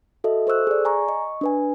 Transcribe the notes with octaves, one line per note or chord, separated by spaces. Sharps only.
F#4 A4 D#5 E5
A4 C5 C#6 E6 F#6
G#4 D5
G#5 A#5 C#6
D#5 C#6
D4 B4 G#5